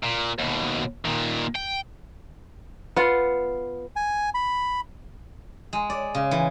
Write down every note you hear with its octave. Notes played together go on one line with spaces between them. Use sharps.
A#2
D#2 B2
A#2 D#3
G5
B3 F4 F#5
G#5
B5
G#3
D5
C#3
E3